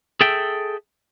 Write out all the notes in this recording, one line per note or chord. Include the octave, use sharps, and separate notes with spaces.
G#4 A4 E5 G5